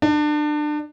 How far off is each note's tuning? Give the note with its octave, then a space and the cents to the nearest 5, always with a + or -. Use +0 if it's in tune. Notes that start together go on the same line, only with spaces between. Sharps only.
D4 +30